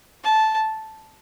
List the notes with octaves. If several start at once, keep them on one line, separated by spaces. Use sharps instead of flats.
A5